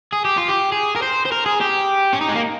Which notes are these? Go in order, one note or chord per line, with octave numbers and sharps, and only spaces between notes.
G#4
G4
F4
G4
G#4
A#4
C5
C5
A#4
G#4
G4
C#4
D#4
G#3
A#3